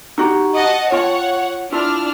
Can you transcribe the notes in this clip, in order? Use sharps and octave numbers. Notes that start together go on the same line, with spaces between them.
D#4 F#4 G4
D#5 F#5 A5
F4 C#5 F#5 G5
D4 E4 F4 F6